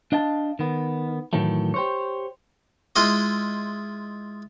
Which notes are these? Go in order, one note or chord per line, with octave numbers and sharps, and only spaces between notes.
D4 D#5 F5 A5
D#3 B3
A2 D#3 E3 F#3 A3
G4 C5 C#5
G#3 E4 F4 D#5